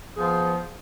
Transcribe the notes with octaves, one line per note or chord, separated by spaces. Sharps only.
F3 B3 G#4